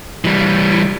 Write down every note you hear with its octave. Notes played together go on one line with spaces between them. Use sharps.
E3 G3